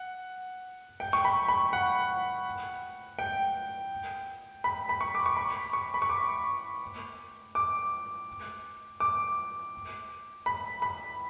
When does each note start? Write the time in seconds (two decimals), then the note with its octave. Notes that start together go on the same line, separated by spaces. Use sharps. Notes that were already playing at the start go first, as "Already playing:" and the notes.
Already playing: F#5
1.00 G5
1.13 C#6
1.25 B5
1.48 B5
1.73 F#5
3.19 G5
4.64 B5
4.89 B5
5.01 C#6
5.15 D6
5.26 C#6
5.37 B5
5.73 C#6
5.94 B5
6.02 C#6
6.09 D6
7.55 D6
9.00 D6
10.46 B5
10.82 B5